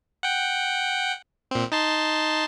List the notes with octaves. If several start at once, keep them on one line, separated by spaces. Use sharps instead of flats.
F#5 G5
A#2 C4
D#4 A5 C6